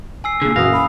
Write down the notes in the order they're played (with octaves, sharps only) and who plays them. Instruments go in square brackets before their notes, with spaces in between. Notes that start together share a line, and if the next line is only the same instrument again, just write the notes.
[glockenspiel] G#5 E6 C7
[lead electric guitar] A#2 D3 [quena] G#4
[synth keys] F#2 A#2 E3 [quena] F#4 [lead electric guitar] F5 [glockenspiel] D#6 A#6
[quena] B5